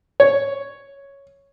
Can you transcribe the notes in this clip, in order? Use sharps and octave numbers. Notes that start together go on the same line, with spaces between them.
C#5